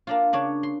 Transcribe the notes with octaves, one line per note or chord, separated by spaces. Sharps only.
A#3 D4 F4
C#3 D4 C#5
C6